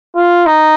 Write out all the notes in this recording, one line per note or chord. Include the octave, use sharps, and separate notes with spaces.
F4
D#4